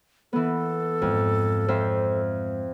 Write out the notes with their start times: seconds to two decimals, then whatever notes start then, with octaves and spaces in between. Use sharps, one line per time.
0.33 E3 B3 A4
1.02 F2 G#2
1.68 F2 C5 E5